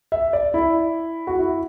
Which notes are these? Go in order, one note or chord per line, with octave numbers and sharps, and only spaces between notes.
E5
D5
E4
F#4
E4